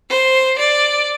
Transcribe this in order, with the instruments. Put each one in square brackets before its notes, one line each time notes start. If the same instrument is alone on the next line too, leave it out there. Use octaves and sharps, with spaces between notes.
[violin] C5
D5